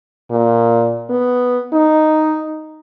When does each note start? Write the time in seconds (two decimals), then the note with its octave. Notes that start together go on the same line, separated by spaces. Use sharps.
0.30 A#2
1.10 B3
1.73 D#4